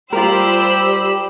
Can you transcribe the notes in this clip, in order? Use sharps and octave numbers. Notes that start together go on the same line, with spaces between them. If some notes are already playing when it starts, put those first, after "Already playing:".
G3 F4 G4 A#4 C5 B5 E6